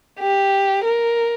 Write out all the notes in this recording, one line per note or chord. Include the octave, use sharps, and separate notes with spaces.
G4
A#4